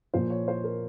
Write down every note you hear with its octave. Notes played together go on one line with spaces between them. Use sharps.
A#2 F3 C5
C#5
C5
A#4